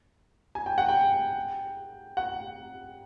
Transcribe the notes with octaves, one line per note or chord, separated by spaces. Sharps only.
G#5
G5
F#5
G5
F#5